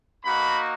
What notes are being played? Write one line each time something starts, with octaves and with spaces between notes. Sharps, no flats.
A#3 D#4 F#4 B5